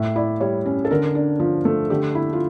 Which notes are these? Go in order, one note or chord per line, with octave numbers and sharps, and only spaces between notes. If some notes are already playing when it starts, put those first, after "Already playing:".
Already playing: A2 E5
E4 D5
G3 C#5
C#4
A4
D3 A#4
D4
F3
A3
D3 G4
E4
F4